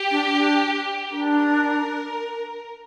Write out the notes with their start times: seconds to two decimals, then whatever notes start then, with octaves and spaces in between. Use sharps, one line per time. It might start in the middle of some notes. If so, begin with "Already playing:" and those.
Already playing: G4
0.11 D4
0.31 D4
1.11 D4 A#4